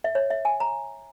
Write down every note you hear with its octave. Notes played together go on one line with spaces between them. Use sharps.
E5
C#5
E5
G#5
A#5